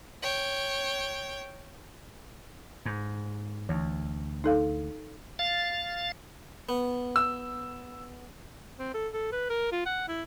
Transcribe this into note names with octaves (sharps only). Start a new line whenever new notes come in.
C#5 G5
G#2
D2 E3
D#4 A4 F5
F5 A6
B3
E6
C4
A4
A4
B4
A#4
F4
F#5
E4